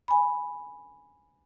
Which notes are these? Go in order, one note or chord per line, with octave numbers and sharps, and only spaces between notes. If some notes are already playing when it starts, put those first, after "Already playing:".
G#5 B5